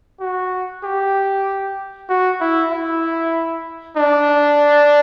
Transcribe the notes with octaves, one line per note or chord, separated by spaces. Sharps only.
F#4
G4
F#4
E4
E4
D4